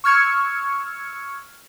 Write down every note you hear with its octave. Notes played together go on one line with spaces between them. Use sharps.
C#6 E6 F6 G#6 C#7